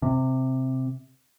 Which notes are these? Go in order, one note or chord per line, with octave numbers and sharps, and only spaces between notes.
C3